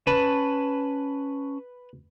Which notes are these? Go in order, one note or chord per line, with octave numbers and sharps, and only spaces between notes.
C#4 B4 A5